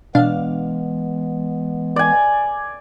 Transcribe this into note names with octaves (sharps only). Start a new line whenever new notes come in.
B2 E3 G#3 B3 D4 F5
D5 G#5